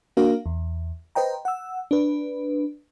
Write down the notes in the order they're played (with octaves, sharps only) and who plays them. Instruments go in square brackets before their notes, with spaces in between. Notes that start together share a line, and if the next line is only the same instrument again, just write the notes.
[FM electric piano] A#3 D4 F#4 A#4 F5
E2
B4 C5 D#5 G5 A#5
F#5 E6
D4 B4